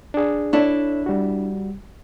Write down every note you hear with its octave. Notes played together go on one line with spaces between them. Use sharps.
D4 G#4
D4 E4 A4 C#5
G3 F#4